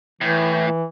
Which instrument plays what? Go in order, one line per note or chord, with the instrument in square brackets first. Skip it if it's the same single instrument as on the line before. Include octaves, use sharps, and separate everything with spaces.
[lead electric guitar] A2 [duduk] E3